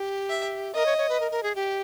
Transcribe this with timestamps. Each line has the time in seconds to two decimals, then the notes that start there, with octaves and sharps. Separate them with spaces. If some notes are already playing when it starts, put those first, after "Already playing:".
Already playing: G4
0.30 E5
0.74 A#4 D#5
0.86 C#5
0.98 C#5
1.09 B4
1.20 A#4
1.32 A#4
1.43 G#4
1.55 G4